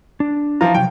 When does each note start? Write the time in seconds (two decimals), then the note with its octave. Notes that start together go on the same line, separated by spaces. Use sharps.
0.20 D4
0.61 E3 F3 F4 A#5
0.74 C3 F#3 G5